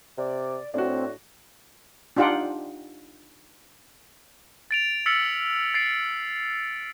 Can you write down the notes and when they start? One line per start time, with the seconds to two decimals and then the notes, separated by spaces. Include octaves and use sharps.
0.18 C3 D5
0.74 A2 C4 D4 F#4
2.17 D4 D#4 F4 G4 F#5 G5
4.71 A6 D7 F7
5.06 E6 F6 A6 B6 C#7 F#7
5.74 A6 C7 D7